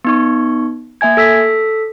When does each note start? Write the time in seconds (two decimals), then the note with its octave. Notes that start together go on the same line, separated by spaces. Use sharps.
0.05 B3 D#4 C#6
1.01 A#3 E5 G#5 G#6
1.17 A4 E6 B6